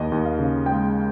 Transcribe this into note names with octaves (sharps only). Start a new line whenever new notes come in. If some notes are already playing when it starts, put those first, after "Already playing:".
Already playing: D#2 D#5
D#2
F5
C#3
G#3 G5